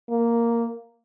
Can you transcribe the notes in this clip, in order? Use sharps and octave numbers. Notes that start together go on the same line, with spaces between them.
A#3